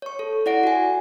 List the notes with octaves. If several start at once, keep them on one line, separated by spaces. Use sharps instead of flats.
C#5 C#6
A4
E4 D5 F#5 A#6 D7
F#4 G#5